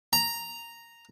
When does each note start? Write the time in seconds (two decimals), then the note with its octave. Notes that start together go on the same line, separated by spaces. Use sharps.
0.13 A#5